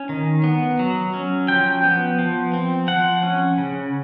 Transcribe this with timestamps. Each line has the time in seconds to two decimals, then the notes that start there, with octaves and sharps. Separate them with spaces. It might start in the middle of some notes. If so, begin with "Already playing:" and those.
Already playing: C#4
0.09 D#3
0.44 B3
0.79 F#3
1.14 C#4
1.48 F3 G5
1.84 B3
2.19 F3
2.54 C4
2.88 F3 F#5
3.23 C#4
3.58 C#3